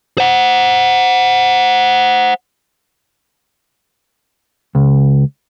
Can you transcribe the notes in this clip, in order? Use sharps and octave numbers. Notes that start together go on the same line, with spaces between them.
C5 F#5
C#2